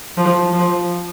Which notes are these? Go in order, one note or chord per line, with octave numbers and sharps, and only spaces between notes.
F3
F3